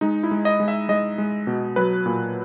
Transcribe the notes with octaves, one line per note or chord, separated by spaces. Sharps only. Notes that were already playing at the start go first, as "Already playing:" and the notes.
G#3 D#4
E4
G#3
D#5
G#3
E5
G#3 D#5
G#3
B2
F#3 B4
A#2